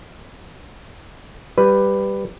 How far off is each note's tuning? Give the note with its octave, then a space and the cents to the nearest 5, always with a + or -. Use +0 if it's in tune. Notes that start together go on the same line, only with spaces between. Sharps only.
G3 +0 B4 +5